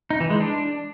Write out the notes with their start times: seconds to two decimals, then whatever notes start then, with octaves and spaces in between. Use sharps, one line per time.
0.10 D#4
0.20 E3
0.30 G#3
0.40 D4